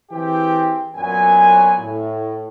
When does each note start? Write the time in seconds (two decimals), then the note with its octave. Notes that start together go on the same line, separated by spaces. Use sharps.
0.10 E3 C4 G4 G#4 G5
0.95 F#2 A#2 F#3 B3 G#5
1.79 A2